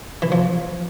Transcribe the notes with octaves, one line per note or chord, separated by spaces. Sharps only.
E3
F3